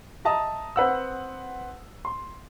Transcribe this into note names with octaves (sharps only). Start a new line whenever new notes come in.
D#5 E5 A5 A#5 D#6
C4 B4 F#5 E6
C6